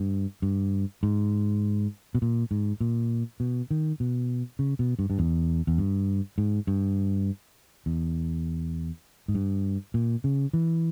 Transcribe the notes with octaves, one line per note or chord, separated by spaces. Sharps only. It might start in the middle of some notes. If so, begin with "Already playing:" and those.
Already playing: G2
G2
G#2
B2
A#2
G#2
A#2
B2
D#3
B2
C#3
B2
G2
G2
E2
E2
G2
G#2
G2
E2
G#2
G2
A#2
C#3
E3